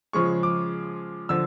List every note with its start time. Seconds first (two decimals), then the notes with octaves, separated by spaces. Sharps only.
0.13 C#3 F3 G#3 C#6
0.43 D6
1.29 D3 F3 E6